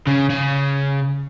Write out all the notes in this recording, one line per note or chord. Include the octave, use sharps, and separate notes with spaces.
C#3
C#3